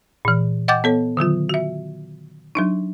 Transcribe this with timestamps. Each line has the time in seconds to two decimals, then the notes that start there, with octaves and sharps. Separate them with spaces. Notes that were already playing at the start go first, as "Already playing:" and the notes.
0.25 A#2 E3
0.68 D#5 F#5 G5 D6 G6 A6
0.84 B3 A4 C#5
1.17 D3 D#3 F#3 F4
1.49 F#4 E5
2.55 F#3 D4 D#4